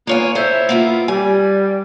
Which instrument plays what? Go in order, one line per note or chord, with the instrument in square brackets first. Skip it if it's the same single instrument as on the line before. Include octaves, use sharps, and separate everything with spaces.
[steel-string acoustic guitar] A#3 C#5 G#5 [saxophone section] B3 F4
[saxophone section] E4 A4 E5 [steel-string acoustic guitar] C5 C#5
[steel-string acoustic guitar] A#3 B3 F4
[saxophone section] G3 [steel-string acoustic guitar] G#5